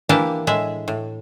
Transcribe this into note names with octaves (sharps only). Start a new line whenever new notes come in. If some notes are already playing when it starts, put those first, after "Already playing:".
E3 A#3 D4 E4 G4 A5
A2 G#3 G#4 E5
A2